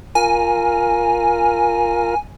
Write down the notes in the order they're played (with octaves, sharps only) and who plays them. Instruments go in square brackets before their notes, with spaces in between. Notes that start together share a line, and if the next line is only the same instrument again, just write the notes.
[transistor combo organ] F4 A#4 [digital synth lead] G#5